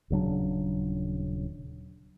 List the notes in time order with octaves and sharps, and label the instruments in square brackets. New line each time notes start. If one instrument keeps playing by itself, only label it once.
[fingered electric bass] D#1 C#3 F#3 D4